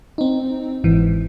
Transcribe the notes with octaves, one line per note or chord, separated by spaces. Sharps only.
C4 D#4
G1 G#2 E3